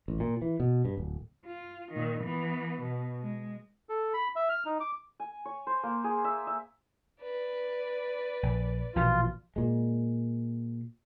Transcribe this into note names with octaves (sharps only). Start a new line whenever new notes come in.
A1
A#2
E3
B2
G2
D1
F4
A#2 D#3
E3 B3
B2
G#3
A4
B5
E5
F6
D#4
D6
G#5
C#5
C5
A#3
G#4
E5
E5
B4 D5
A#1
A#1 B2 E3 F4
A#2 G#3